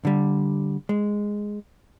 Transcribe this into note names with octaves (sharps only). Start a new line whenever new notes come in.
D3 G3
G#3